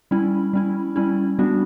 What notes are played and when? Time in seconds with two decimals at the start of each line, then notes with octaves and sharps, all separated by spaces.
0.11 G3 C#4 E4
0.53 G3 C#4 E4
0.96 G3 C#4 E4
1.39 G3 B3 D4 F#4